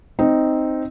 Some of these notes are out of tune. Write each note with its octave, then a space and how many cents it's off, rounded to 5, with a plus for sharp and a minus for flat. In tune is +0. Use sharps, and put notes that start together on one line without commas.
C4 +0 D#4 +0